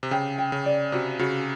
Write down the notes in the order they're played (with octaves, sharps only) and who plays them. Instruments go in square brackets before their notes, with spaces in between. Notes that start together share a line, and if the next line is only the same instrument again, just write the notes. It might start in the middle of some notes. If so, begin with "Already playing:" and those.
[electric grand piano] C3
[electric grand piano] C#3 [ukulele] G5
[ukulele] G5
[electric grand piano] C#3
[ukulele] D5
[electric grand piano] C3 [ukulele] F#4
[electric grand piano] C#3 [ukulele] F#4